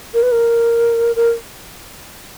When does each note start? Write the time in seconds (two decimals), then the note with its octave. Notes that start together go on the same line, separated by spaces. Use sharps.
0.14 A#4
0.23 B4
0.32 A#4
1.16 A#4